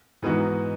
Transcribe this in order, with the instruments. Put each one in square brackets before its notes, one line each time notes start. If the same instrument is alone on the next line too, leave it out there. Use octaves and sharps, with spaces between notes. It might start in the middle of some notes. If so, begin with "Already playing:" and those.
[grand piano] G#2 E3 B3 D#4 F#4